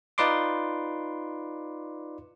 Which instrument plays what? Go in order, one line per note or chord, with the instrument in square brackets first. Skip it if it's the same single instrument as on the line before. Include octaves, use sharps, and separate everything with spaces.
[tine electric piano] D#4 F4 B4 D5 C6 D6